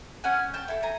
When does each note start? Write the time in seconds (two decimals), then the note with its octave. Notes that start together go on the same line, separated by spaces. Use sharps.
0.24 C#4 F#5 G#5
0.54 G5 A5
0.68 E4 A4
0.83 G#5 A#5